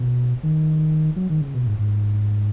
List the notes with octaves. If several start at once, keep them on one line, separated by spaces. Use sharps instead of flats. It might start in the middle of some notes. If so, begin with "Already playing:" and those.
Already playing: B2
D#3
F#3
D#3
C#3
B2
G#2
G#2